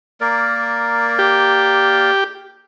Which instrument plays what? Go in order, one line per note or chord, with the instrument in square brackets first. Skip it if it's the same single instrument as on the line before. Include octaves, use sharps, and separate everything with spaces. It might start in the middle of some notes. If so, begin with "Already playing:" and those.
[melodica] A#3 A#4 D5
[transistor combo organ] G4